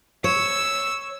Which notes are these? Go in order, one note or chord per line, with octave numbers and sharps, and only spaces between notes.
C#5 E6